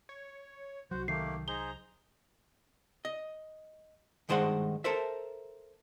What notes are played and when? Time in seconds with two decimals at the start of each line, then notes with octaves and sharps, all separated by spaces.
0.09 C#5
0.91 C2 F#3 F#4 C5
1.08 D#3 A3 A#3 G4 C7
1.48 D#4 G#4 C5 A#5 G7
3.05 D#5
4.29 G2 D#3 G#3 C5 D#5 F#5
4.84 A4 A#4 C5 E5